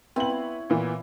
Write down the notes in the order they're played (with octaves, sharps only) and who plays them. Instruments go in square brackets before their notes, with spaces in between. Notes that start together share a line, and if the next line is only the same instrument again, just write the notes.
[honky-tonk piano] B3 F#7 [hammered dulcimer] C4 E4
[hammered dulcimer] C#5
[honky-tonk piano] A#2 E3 B3